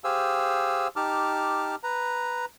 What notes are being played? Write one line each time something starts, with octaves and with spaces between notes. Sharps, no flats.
G4 G#4 C5 F5 G#5 E6
D#4 G4 A5 D6 F6
B4 A#5